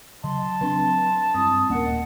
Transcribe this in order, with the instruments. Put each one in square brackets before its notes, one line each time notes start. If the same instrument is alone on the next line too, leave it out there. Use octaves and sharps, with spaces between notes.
[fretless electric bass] C#3 [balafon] F#3 [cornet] A5 [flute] C6
[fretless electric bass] F#3 C4 [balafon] D4 B4
[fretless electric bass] G2 [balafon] C4 E4 [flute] D#6
[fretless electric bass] D#1 A#3 C#4 [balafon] A#4 D#5 [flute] F#5